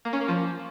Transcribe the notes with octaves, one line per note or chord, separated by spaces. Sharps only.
A#3
C#4
A#3
F3